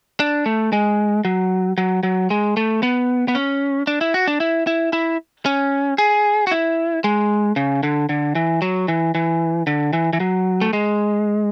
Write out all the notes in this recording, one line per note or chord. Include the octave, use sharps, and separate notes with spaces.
D4
A3
G#3
F#3
F#3
F#3
G#3
A3
B3
B3
C#4
D4
E4
F#4
D4
E4
E4
E4
C#4
G#4
F#4
E4
G#3
C#3
D3
D3
E3
F#3
E3
E3
D3
E3
E3
F#3
A3
G#3